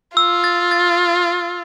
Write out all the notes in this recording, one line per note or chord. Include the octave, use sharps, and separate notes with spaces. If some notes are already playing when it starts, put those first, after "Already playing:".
F4 E6
A6
A6